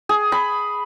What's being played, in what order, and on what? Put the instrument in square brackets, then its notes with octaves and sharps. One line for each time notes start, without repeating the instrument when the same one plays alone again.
[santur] G#4
B5